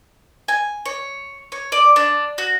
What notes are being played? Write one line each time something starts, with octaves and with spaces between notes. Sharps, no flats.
G#5
C#5
C#5
D5
D4
F#4